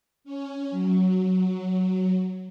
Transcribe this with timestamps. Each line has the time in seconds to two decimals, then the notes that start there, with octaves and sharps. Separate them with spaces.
0.24 C#4
0.71 F#3